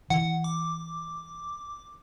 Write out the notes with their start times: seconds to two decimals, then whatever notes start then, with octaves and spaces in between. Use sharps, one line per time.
0.10 E3 F#5
0.44 D6